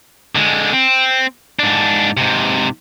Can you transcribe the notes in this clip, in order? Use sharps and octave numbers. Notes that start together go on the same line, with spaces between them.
D3 G#3
C4
G#2 D4
G#2 C3